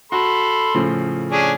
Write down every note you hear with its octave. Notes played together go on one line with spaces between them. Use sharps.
F#4 A4 B5 C6
A2 C#3 F3
C#4 D4 G#4